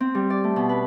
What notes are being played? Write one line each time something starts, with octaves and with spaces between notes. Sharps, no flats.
C4
G3
D5
A3
B2
B4